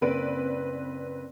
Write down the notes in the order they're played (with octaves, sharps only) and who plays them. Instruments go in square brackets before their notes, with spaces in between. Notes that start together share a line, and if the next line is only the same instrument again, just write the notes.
[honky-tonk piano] F#1 A#3 C4 B4 D5 D7